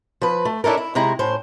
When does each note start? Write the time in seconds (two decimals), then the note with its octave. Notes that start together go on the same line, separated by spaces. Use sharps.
0.22 F3 B4
0.45 A3
0.64 C#4 D4 E4 A4 A#4
0.77 E4
0.95 C3 G#3 E4 A#5
1.19 A2 C#4 C5